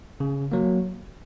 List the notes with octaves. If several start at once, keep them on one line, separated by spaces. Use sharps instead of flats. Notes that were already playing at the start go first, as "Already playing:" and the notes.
C#3
F#3 A#3